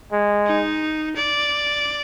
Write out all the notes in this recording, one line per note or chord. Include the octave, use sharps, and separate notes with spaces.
G#3
D#4
D5